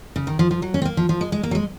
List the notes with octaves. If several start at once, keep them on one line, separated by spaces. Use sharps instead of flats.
C#3
D#3
F3
F3
F#3
C#4
C4
A#3
F3
F3
G#3
G#3
A#3
F#3
G#3